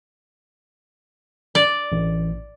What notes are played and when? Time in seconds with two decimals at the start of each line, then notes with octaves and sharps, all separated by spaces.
1.55 D5
1.92 A1